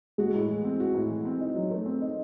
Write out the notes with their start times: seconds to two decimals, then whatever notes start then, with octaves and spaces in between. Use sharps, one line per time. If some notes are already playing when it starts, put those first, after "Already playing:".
0.18 G#3 F#4
0.34 A2
0.49 E3
0.64 C4
0.80 F#4
0.95 A2
1.09 E3
1.25 C4
1.41 D#4
1.55 F#3
1.71 A3
1.86 C4
2.02 D#4